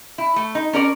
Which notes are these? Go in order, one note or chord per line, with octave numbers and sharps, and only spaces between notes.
E4
A3
D#4
C#4 A#4 D5